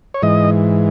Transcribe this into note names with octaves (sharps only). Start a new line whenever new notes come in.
C#5
G#2 E3 D#5